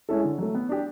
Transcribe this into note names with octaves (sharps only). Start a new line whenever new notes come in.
G#3 C#4 E4 A4
D3
F#3 A3
B3
D4 G4